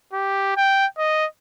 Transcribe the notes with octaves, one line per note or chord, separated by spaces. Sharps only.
G4
G5
D#5